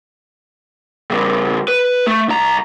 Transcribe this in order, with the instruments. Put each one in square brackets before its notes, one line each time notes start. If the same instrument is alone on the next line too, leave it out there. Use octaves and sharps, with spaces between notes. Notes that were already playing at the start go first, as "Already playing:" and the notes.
[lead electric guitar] C#3 G3
B4
A3
C2 A#5